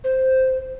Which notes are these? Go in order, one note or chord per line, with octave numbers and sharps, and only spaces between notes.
C5